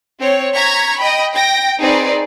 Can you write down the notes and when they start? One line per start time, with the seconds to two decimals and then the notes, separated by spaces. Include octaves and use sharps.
0.20 C4 C#5
0.55 A#5 C#6 G#6 B6
0.99 D#5 G5 B5
1.33 G5 A#6
1.80 C4 D#4 G#4 B4 D5